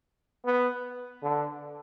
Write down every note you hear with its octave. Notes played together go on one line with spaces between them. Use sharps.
B3
D3